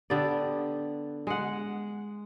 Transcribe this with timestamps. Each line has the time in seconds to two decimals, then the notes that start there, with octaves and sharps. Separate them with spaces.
0.10 D3 B3 G4 D5
1.27 G#3 F#5